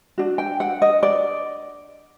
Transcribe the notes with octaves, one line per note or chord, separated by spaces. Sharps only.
D4 F#4
G5
F#5
D#5
D5